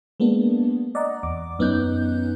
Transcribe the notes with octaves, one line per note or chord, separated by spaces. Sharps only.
G#3 A#3 B3 D4
D5 D#5 F#5 A#5
E2 D6
F#2 B3 C#4 D#4 F#6 G6